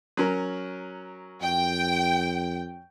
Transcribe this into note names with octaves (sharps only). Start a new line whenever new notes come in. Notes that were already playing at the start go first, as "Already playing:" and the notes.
F#3 C#4 A#4
F2 G5